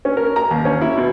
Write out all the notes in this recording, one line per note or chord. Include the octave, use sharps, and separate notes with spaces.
C#4
A#4
A#5
D#2
C#4
E4
B2